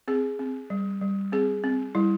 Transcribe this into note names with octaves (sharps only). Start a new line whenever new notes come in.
C4 G#4
C4
G3
G3
C4 G#4
C4
G3 E4